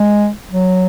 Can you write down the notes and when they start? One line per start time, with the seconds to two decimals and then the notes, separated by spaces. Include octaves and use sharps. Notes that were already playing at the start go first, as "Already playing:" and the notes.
Already playing: G#3
0.51 F#3